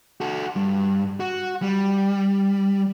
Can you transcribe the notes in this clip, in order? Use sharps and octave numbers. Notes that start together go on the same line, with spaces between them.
F#4 A4
G2
F#4
G3